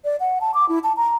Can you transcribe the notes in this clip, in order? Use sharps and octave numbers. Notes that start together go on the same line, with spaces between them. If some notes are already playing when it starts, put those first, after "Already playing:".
D5
F#5
A5
D6
E4
A5
A#5